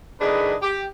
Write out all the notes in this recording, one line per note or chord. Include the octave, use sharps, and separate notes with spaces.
A2 D#3 D4 G#4 B4 D#5
G4